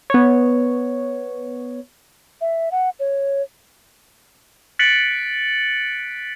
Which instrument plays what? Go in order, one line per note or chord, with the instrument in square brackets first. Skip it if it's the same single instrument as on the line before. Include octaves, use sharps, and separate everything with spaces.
[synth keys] B3 C#5
[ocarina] E5
F#5
C#5
[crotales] F#6 A6 B6 C#7 D7 F#7